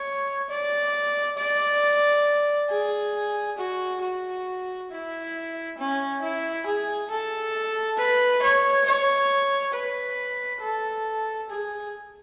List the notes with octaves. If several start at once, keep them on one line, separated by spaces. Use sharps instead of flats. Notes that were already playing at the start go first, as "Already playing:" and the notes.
Already playing: C#5
D5
D5
G#4
F#4
F#4
E4
C#4
E4
G#4
A4
B4
C#5
C#5
B4
A4
G#4